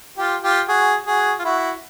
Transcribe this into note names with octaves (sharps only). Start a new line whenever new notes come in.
F4 G4
F4 G4
F#4 G#4
F#4 G#4
F4
E4 F#4